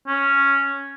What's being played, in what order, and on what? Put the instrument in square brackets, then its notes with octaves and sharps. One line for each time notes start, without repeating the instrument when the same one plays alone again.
[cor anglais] C#4